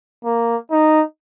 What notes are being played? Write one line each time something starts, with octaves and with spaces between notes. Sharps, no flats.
A#3
D#4